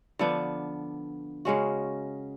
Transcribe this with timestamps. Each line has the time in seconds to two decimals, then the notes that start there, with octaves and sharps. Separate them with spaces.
0.19 D3 F3 B3 D4
1.45 C#3 G#3 C#4 F#4